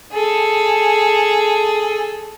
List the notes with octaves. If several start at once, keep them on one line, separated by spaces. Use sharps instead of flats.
G#4 A4